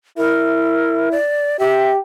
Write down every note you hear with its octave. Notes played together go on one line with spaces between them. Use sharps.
E4 A#4
D5
G4 E5